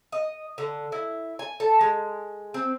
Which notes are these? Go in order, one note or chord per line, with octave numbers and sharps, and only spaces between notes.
D#5
D3
E4
G#5
A4
G#3
C4